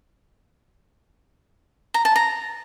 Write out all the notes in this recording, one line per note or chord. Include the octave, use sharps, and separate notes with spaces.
A#5
A5
A#5